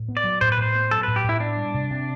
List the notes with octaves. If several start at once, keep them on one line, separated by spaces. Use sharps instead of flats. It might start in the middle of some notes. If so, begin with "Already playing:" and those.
Already playing: A2
B3
D5
F#3
A2 C5
B4
A2 C5
B3
F#3 A4
A2 B4
G4
A2
E4
B3 D4
G3
C3
C3